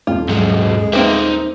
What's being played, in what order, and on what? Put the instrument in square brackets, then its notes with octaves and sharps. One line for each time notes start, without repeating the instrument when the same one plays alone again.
[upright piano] D#1 F2 [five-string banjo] F4
[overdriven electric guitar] G#2 F#3 [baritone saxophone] G#3
[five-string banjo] A#3 C4 B4 [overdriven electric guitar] D#4 E5